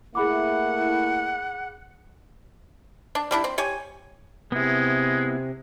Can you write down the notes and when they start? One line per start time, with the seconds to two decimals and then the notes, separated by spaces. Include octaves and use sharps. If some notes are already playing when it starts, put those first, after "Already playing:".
0.15 A3 A#3 E4 G#4 F#5 B5 D6
3.15 D4
3.31 G3 D4 E4
3.44 C4
3.58 G4 C#5 G#5
4.52 C3 G#3 B3 E4